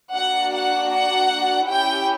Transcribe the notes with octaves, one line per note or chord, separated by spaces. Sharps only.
A#3 D4 F#4 F#5
F#5
F#5
C#4 E4 G4 G5